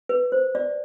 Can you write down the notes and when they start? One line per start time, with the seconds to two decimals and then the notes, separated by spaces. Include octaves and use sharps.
0.09 B4
0.32 C5
0.55 D5